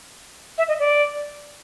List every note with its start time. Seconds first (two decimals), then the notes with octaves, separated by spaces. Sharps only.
0.58 E5
0.68 D#5
0.79 D5